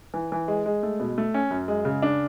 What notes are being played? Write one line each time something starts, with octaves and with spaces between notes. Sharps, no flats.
E3
E3
G#3
G#3
A3
B2
A3
C#4
F#2
G#3
C#3
D4